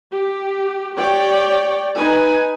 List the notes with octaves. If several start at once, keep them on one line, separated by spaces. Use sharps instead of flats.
G4
G4 C#5 D5 G5
D#4 B4 G#5